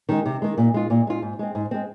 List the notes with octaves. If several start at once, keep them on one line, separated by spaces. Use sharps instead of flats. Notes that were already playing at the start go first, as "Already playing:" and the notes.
D#3 G#3
C3
D#3 G#3
A#2
G#3 F4
A#2
G#3 F4
G#2
G#3 C4
G#2
G#3 C4